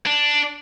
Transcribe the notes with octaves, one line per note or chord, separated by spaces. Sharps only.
D4